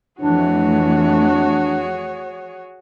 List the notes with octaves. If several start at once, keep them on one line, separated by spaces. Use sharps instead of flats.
F2 E3 A3 D4 F#4 G#4 C#5